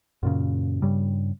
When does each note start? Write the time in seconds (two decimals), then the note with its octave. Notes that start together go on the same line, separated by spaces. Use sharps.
0.23 F#2 A#2 C#3
0.82 G2 C#3 G3